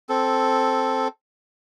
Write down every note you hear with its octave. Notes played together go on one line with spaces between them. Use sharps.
C4 A4